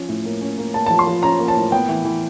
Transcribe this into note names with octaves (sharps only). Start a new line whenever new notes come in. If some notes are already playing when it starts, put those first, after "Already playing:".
Already playing: F3 C#4
A2
A#3
C#4
A#3
A#3 A5
A5
F3
C6
F3
C#4 A#5
A#3
A5
A2
B3 G5
E3
E3